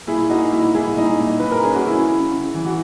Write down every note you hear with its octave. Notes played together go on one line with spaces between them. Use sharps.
A#2 E4 G#4
A#3 D#4 F#4
A#2 E4
A#2 E4 G#4
A#2 D#4
A#2
A#2 B4
A#4
C#4 G#4
F#4
C#3 E4
C#3
C#3
E3
F#4